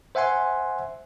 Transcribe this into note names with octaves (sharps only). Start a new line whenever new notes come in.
C5 E5 F#5 G#5 C6